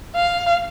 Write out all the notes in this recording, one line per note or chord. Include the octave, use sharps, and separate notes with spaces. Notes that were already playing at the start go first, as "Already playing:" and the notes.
F5